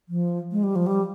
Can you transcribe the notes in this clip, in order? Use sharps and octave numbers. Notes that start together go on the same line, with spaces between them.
F3
G#3
G3
F3
G3